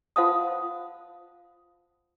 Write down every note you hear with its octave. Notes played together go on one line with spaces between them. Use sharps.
F4 C5 F5 F#5 A5 D#6